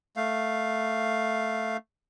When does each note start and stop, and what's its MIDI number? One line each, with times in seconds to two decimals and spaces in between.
0.17 1.77 57
0.17 1.77 77